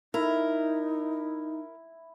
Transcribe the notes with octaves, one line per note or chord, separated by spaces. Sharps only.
D#4 E4 A#4